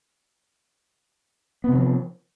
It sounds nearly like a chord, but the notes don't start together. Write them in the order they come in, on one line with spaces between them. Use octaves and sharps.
B3 C3 D#3 F3